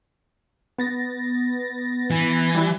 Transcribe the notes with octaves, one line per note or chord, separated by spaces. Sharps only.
B3 A6 A#6
E3
G3 E4